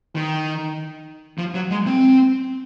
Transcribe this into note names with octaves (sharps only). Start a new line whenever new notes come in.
D#3
F3
F#3
G#3
C4